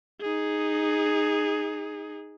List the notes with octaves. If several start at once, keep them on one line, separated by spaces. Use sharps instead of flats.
D#4 G#4